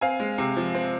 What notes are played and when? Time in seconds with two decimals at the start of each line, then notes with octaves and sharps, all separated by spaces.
0.01 C4 F5 G#5
0.20 G#3
0.38 C3
0.56 F3
0.75 C4